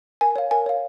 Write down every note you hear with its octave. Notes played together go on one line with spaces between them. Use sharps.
A#4 G#5
C#5 F5
A#4 G#5
C#5 F5